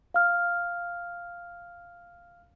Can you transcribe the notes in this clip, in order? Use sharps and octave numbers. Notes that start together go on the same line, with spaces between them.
F5 F6